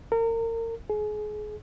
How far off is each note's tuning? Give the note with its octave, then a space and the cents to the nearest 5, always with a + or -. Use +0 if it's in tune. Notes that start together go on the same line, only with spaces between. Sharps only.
A#4 -30
G#4 +30